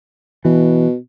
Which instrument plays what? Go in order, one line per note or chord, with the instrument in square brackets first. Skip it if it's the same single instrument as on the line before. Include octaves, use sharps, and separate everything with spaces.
[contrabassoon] B2 [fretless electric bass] E3